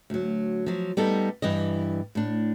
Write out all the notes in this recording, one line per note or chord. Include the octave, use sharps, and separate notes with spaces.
D2 F#3
F3 F#3
G3 B3 D#4 A4
G2 E3 G3 D#5
A2 D4